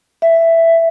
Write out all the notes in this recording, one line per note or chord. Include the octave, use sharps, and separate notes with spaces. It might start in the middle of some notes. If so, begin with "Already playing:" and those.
E5